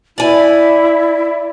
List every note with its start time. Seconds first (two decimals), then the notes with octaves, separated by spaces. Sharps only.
0.18 E4 D5 G#5